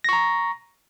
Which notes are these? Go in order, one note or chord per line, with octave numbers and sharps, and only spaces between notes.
A#5 C#6 A#6